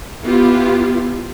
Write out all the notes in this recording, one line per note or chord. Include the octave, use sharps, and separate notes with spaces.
B3 E4 F4 G4